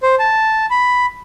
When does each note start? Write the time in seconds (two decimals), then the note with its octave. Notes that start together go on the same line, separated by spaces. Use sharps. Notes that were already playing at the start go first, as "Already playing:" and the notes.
0.03 C5
0.19 A5
0.71 B5